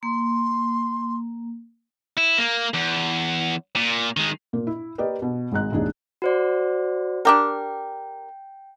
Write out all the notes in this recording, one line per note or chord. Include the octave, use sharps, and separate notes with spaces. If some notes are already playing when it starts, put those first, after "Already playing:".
A#3 C6
E4
A#3
E2
A#2
D#3 G#3
A#2 A#3
E4
A#3 G4 A#4 B4 D5 D#5
B2
G#1 G#3 A#5 F#6
E1 A1 D4 D#4 G#4
F#4 C5 D5
D4 G4 A#4 G5